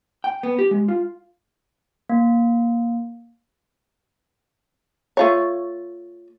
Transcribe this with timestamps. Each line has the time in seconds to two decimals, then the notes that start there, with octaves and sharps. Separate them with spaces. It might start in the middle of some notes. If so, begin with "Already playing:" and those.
0.24 G5
0.43 B3
0.59 G4
0.71 G#3
0.88 F4
2.09 A#3
5.17 A3 F4 C#5